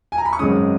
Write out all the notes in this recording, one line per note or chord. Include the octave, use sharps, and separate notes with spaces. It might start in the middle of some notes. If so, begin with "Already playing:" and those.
G#5
A#5
B5
C#6
G#1 F#2 C#3 G#3 C#4 D#6